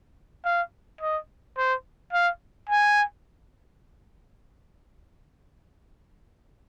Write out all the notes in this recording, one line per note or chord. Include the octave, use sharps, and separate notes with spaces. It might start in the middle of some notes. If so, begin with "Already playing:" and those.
F5
D#5
C5
F5
G#5